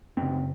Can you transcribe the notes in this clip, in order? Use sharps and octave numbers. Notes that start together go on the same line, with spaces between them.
F#2 C#3 C4